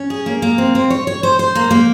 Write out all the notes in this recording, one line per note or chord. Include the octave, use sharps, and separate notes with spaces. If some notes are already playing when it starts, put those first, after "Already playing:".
Already playing: C#4
G#4
A#3
A#3
C4
C4
C#5
C#5
C5
C5
A#3
A#3